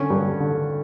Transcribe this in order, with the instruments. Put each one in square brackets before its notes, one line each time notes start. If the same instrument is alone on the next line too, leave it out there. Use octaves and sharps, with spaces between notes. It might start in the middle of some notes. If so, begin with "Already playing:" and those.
Already playing: [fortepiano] D3 C#4
G2
D3